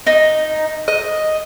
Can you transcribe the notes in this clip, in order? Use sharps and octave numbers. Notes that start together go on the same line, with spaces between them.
D#4
D#5